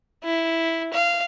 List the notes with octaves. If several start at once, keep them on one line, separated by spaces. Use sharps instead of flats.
E4
F5